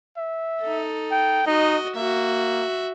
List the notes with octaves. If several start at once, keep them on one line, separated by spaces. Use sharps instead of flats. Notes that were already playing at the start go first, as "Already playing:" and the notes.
E5
D#4 A4
G5
D#4 F#4 D#5
A#3 F#4 E5